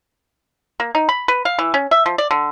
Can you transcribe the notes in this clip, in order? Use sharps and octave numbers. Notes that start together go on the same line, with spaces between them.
A#3
D#4
B5
B4
F5
E3
C#4
E5
F3
D5
D3